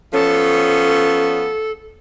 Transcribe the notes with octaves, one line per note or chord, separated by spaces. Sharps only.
F3 B3 C#4 A4